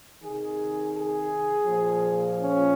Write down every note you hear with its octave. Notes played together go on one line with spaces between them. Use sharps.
C3 D#3 G#4
G#4
A#2 F3
C#4